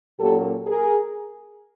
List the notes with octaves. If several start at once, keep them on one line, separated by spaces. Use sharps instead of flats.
A#2 F#3 A#3 C#4 G4 A4
G#4 A#4